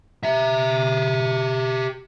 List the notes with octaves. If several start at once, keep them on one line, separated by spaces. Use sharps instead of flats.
G4 E5